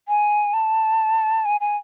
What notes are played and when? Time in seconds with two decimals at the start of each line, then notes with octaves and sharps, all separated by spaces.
0.08 G#5
0.53 A5
1.45 G#5
1.61 G#5